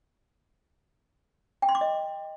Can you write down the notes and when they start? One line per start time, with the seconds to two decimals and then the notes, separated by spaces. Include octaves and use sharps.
1.62 G5
1.69 C6
1.75 D6
1.81 D#5